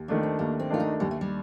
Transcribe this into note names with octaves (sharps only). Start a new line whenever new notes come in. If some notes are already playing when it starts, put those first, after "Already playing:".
Already playing: D#2
D#3 A3 A#3 D4
C4
D#2 A#3
C4
D#3 A3 D4 F4
D#4
D#2 G3
A3
G3